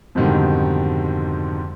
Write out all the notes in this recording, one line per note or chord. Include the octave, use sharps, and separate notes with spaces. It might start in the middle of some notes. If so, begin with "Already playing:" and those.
F2 G#2 B2 D3 D#3 G3